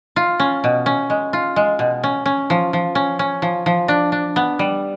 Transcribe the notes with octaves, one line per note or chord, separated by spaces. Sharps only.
F4
C#4
B2
C#4
G#3
F4
G#3
B2
C#4
C#4
F3
F3
C#4
C#4
F3
F3
D4
D4
B3
G3